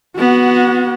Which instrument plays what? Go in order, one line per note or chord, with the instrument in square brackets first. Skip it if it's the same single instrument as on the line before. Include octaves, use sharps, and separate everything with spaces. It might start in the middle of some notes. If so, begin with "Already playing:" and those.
[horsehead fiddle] B3 F#4